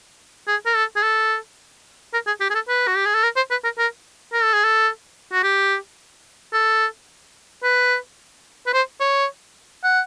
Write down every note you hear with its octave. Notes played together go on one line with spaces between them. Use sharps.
G#4
A#4
A4
G#4
A4
A#4
G#4
G4
G#4
A4
B4
F#4
G4
G#4
A4
A#4
C5
B4
A#4
A#4
A#4
A4
G#4
A4
F#4
G4
A4
B4
B4
C5
C#5
F#5